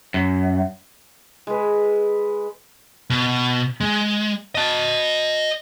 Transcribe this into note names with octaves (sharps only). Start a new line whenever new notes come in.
F#2
G#3 B4
B2
G#3
D#5 A5